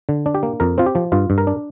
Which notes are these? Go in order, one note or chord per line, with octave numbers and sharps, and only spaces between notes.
D3
D4
G4
A#3
F2 A#4
C4 F4
G4
F3
G2 F4
G2
A#4
D4